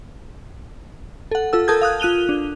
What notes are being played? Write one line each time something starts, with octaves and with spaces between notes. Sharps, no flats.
A4 F#5
F4 A4 E6
A4 A#4 A5 D#6 G6 G#6
F5 D#6 F#6
F4 F#6 D#7 F7 G7
D4